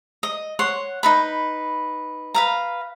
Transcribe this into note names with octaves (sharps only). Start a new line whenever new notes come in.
D#5
C#5 F#5 C6
D#4 B4 B5
B4 F5 A#5